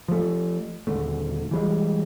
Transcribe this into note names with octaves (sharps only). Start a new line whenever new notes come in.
F3 A3
D#1 D2 A3
E3 G3 G#3